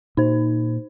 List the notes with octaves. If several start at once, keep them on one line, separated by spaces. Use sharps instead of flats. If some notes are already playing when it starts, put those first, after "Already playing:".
A#2 D#4 C5